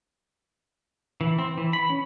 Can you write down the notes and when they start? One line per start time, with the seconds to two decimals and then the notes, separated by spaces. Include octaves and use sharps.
1.21 E3
1.39 C4
1.58 E3
1.73 B5
1.90 C#4